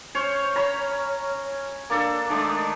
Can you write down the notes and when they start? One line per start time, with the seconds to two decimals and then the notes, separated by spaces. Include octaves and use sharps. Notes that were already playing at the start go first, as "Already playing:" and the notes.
0.15 C#4 C5 C#5
0.55 C#4 A#5 B5
1.90 A#3 D4 A4
2.29 D#3 G#3 A3 D4